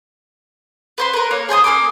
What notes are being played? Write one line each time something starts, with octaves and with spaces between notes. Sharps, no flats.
B4 C5 C6
A#4 B4
A#3 C#5
G#4 C5 G#5 D#6
A#3 B3 G#5 D6